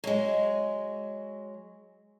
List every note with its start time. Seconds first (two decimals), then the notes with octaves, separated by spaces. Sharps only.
0.04 F#3 G#3